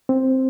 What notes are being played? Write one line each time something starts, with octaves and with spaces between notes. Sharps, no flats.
C4